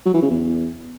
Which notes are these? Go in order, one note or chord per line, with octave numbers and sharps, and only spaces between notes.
F#3
E3
C#3
E2